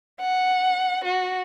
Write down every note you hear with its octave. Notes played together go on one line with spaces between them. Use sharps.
F#5
F#4